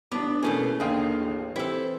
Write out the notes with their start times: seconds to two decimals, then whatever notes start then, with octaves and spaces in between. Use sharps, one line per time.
0.12 A1 B3 D4 D6
0.43 B2 E3 A3 A#3 C#4 G#4 A4
0.80 D#2 D3 D#3 G#4 F5 G5
1.16 A1
1.56 E3 C4 E4 G4 A4